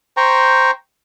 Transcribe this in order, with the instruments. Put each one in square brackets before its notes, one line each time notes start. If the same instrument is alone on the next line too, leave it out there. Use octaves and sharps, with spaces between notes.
[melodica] C5 G5 A#5 C#6